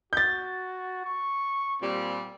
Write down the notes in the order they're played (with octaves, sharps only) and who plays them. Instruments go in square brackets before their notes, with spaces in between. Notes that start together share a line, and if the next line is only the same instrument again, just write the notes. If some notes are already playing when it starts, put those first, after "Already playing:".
[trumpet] F#4 [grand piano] G6 A6
[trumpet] C#6
[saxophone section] A#2 G3 [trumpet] C4